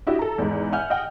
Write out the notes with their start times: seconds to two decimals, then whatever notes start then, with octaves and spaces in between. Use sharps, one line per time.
0.07 D4 E4 F#4 G4 D#5 E5
0.19 A4 A#5
0.38 E2 G#2
0.72 E5 F#5 G#5 F6 G6
0.90 D#5 F#5 G5